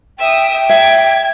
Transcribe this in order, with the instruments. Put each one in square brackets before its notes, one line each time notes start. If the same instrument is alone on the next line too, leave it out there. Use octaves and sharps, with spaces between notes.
[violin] E5 D#6 [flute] G5
[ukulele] E5 [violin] G#6